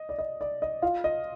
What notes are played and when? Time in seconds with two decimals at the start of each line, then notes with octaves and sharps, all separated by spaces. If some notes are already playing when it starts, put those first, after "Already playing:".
Already playing: D#5
0.09 D5
0.19 D#5
0.41 D5
0.62 D#5
0.82 F4 F5
1.04 D#5